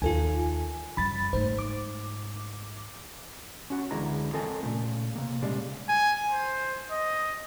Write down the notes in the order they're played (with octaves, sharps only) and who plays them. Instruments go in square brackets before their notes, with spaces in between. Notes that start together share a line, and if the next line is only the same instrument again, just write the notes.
[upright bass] D#2 D#3 [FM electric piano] F4 A4 G#5
[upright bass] F#2 G3 [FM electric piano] B5 A6
[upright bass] G#2 A3 [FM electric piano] C5
[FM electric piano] D6
[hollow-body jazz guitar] C#4 F#4
C#2 D3 E3 G#3 E4 A#5
C4 F4 A4 A#4 D#5 G#5
A#2 C#3 A3
C3 A#3
A#2 C#3 G3 G#3 D5
[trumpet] G#5
C5
D#5